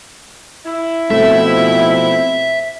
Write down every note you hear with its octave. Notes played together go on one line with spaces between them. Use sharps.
E4
B2 F3 A3 C4 E5